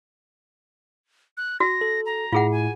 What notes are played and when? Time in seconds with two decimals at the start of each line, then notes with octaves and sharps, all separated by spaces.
1.37 F#6
1.60 F#4 A#6
1.81 A4
2.06 A#5
2.33 A2 E4 F4 G#4 F#5
2.51 G#5